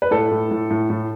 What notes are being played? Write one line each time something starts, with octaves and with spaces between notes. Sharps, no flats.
B4
A2 A4
A2
A2
A2
A2